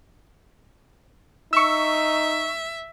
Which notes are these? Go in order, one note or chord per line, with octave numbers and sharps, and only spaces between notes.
D#4 E5 C#6 E6